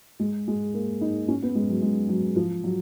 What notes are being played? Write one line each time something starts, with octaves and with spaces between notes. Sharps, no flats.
G#3
G#3
A#3
D#4
C#4
B3
G#3
F#3
G#3
F#3
F3
F#3